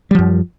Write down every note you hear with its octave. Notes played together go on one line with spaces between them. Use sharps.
F#2 F3 G3